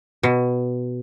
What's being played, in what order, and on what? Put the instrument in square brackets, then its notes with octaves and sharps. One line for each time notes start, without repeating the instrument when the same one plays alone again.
[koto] B2